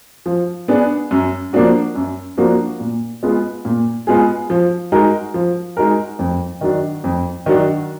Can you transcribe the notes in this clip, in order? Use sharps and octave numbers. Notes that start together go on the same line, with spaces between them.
F3
B3 D4 G#4
F#2
F3 A#3 D4 F#4
F#2
F3 A#3 D4 F#4
A#2
G#3 B3 F4 G#4
A#2
G#3 B3 F4 G#4
F3
G#3 D#4 F#4 A#4
F3
G#3 D#4 F#4 A#4
F2
D#3 F#3 D4 F#4
F2
D#3 F#3 D4 F#4